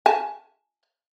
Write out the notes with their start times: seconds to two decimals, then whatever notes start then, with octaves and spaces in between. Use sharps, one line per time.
0.06 G#5 A5